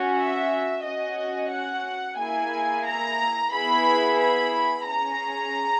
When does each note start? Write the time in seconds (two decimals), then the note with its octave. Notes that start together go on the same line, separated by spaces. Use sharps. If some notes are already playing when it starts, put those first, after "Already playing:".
Already playing: C#4 F#4
0.17 E5
0.84 C#4 F#4 D#5
1.52 F#5
2.18 A#3 E4 G#4 G#5
2.86 A#5
3.53 B3 E4 G#4 B5
4.21 B5
4.87 C#4 G#4 A#5